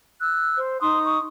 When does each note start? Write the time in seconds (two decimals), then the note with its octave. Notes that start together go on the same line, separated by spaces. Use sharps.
0.21 E6 F#6
0.57 C5
0.81 D#4 C6 D#6
1.05 C#6